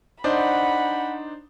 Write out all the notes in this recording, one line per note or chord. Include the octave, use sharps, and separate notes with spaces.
D4 D#4 C5 F#5 B5